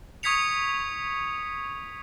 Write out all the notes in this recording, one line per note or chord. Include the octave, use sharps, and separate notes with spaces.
C#6 D#6 G#6 B6 C#7 F7